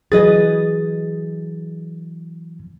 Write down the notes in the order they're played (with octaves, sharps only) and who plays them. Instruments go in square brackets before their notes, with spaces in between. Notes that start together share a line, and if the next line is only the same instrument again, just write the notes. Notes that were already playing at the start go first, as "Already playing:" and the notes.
[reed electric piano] E3 F#3 A6 [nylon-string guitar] G#4 B4 D#5